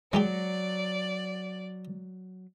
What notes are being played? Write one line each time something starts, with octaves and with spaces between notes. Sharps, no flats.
F#3 G#3 D#4 G4 D5